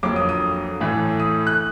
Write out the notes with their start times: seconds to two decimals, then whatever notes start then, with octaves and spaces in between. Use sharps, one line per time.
0.03 F2 D3 F#3 A#3 D6
0.16 D#6
0.29 D#6
0.80 A2 E3 A3
1.20 D#6
1.47 F#6